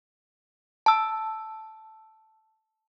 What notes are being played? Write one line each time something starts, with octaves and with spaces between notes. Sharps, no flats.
A5 E6